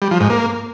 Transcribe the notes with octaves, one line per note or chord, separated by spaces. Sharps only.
G3
F3
G#2
A#3